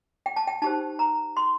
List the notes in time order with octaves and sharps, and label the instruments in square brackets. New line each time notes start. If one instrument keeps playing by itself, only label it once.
[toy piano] G5
A5
G5
D#4 G4 C5 A5
A#5
C6